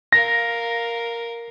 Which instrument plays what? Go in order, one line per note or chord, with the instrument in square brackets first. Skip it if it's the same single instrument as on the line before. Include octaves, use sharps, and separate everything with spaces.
[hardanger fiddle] A#4 F5 [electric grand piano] A#6